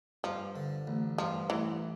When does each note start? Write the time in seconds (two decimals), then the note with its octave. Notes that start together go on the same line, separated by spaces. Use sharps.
0.24 G2 F3
0.56 D3
0.87 A1
1.18 G2 F3
1.50 A1 E3